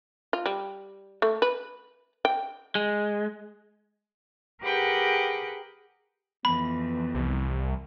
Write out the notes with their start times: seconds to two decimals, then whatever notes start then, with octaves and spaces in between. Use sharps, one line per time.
0.33 F4
0.46 G3
1.22 A3
1.42 B4
2.25 G5
2.75 G#3
4.62 G4 G#4 A#4 B4 F#5 G5
6.45 F2 E3 B3 B5
7.15 C2